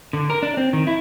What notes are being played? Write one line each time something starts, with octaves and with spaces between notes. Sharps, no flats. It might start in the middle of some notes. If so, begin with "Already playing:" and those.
D3
A#4
D4
C4
D#3
E4